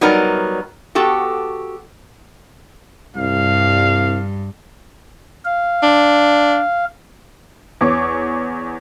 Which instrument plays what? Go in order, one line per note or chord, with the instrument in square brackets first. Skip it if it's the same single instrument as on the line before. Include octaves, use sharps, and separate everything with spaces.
[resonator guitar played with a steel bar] F#3 G3 B3 D#4 A#4 D5
B3 F#4 G4 A4
[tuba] C2 [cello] G2 G3 [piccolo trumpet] F5
[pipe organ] F5
[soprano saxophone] D4
[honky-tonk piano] E2 C#5 D6